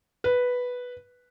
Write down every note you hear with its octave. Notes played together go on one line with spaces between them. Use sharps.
B4